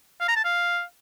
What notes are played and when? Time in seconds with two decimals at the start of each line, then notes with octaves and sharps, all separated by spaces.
0.20 F5
0.28 A#5
0.36 A5
0.44 F5